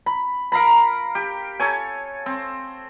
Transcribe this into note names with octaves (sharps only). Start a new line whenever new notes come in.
B5
A#4 F5 A#5 B5
G4
A4 C#5 G#5
C4